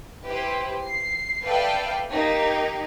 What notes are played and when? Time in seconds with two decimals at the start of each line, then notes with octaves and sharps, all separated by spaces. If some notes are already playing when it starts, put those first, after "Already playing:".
0.25 E4 G4 B4 C5
0.84 C7
1.46 A4 B4 D5 E5 F5 G5
2.10 A#3 D#4 G4